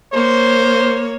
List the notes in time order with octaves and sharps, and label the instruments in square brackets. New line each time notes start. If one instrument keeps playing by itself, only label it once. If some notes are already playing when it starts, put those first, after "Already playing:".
[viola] A#3 C#5 [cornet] C5